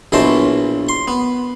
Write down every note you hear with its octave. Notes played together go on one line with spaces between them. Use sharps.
A#1 B2 E3 F#3 C5 A5
C6
B3